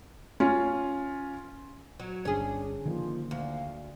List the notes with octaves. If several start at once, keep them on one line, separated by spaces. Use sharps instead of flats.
C#4 F4
F#3
G1 C#4 D4 G#4
D3 D#3 F3 A#3
D2 F5